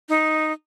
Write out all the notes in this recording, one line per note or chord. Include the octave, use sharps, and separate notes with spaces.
D#4